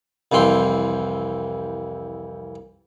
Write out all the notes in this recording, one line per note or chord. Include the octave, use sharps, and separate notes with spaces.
C2 F2 E3 G5 C6